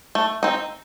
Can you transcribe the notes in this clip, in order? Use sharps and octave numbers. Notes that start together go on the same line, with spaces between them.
A3
C4 D#4